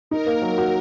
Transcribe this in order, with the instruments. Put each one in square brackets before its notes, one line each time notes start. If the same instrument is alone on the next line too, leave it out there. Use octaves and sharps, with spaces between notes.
[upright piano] D#4 [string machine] A#4
[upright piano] A#3
F#3
F#4